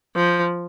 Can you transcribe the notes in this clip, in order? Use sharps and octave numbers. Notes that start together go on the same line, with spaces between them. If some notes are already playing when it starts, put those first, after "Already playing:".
F3